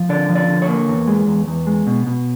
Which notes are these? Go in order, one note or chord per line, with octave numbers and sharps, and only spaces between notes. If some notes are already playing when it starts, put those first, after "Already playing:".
Already playing: F3
D3 D5
F3
D5
D3
C#5
A#3
E2
G#3
E2
E2
G#3
B2
B2